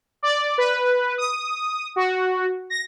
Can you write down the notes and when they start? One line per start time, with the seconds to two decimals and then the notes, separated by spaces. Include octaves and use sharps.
0.23 D5
0.58 B4
1.18 D#6
1.96 F#4
2.70 A#6